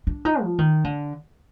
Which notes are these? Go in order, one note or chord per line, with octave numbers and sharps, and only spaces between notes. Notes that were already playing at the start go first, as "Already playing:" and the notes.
D4
D#4
F3
D#3
D3